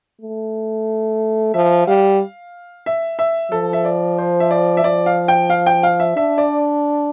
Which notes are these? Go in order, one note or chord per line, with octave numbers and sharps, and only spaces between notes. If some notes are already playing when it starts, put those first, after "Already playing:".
A3
F3 E5
G3 F5
E5
E5
F3 A4
E5
D5
C5
E5
D5
E5
F3 D5
F5
G5
F5
G5
F5
E5
D4 E5
D5